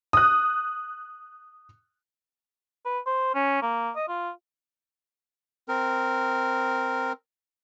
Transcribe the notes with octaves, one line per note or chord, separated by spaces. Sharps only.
D#6 F#6
B4
C5
C#4
A#3
D#5
F4
C4 A#4